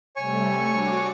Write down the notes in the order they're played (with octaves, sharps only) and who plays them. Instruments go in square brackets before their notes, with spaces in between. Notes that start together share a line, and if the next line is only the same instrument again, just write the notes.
[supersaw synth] C3 G3 A3 [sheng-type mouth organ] C#5 G#5 C#6
[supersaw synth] D4 F#4 D6